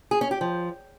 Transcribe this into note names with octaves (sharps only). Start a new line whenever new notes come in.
G#4
C#4
G4
F3